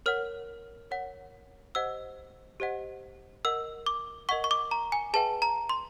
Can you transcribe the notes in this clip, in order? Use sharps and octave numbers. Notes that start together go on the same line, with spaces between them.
A#4 C#5 F#5 F6
A#4 C#5 F#5
G4 C5 D#5 F#5 E6
G4 C5 D#5 F#5
A#4 D#5 F#5 E6
D6
A#4 D#5 F#5 C#6
C#6
D6
A#5
G#5
G#4 B4 E5 G5 A5
A#5
C6